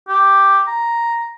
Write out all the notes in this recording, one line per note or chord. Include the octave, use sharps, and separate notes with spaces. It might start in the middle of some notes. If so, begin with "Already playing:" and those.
G4
A#5